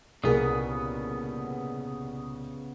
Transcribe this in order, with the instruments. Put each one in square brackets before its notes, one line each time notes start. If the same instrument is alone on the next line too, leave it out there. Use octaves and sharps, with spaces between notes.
[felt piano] C2 A#2 A#4 [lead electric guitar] C#3 B3 [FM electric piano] G#4 D#6